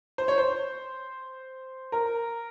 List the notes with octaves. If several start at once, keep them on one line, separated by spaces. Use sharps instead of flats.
C5
C#5
C5
A#4